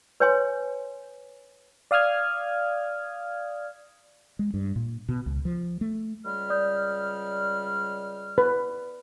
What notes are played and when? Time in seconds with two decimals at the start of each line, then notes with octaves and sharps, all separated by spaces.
0.20 B4 C#5 G#5 C6
1.91 D5 F5 D#6 F6 G#6
4.39 G#3
4.54 G2
4.76 A#2
5.09 B2
5.26 C#2
5.45 F3
5.81 A3
6.26 C#2 G3 F6
6.50 D5 D#6 G6
8.38 B4